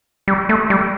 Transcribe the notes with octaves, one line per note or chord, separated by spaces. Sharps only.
G3
A3
G3